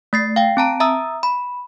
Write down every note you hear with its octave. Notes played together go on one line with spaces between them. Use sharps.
A3 A6 C7
F5 G5
C4 A5 A#5 D7
E5 A#5 D#6 E6
B5